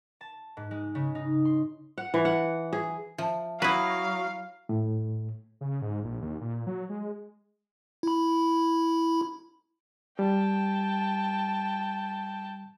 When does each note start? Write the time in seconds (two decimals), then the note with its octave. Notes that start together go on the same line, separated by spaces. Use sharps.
0.21 A5
0.57 G#2
0.71 G#3
0.95 C#3
1.15 D#4
1.45 C6
1.98 F#5
2.14 E3
2.25 F#5
2.73 G#4
3.18 F3 E5 A5
3.62 F#3 E4 B4 F5 F#5 C#6 D#6
4.69 A2
5.61 C#3
5.82 G#2
6.04 A#1
6.21 D#2
6.41 A#2
6.67 F#3
6.89 G#3
8.03 E4 B5
10.19 G3 G5 A5